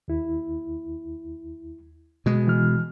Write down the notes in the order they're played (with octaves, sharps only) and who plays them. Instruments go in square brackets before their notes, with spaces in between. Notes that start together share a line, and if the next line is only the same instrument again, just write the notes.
[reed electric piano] D#2 E4
[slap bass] B2 G#3
[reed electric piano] E3 F6